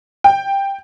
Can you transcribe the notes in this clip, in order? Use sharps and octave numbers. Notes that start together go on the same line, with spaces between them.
G5